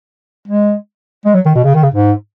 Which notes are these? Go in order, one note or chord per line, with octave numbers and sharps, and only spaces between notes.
G#3
G#3
F#3
D#3
B2
C#3
D#3
C#3
G#2